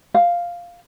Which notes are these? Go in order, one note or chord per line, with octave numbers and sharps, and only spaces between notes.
F5